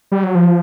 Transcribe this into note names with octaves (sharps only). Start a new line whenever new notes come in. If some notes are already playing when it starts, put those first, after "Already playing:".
G3
F#3
F3